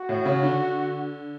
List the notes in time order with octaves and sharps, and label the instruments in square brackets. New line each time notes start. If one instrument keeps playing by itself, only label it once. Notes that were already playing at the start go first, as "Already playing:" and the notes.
Already playing: [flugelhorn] F#4
[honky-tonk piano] A2
C#3
D3